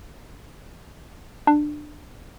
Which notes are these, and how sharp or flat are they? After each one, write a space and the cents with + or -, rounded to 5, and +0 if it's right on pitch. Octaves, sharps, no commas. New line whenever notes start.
D4 +20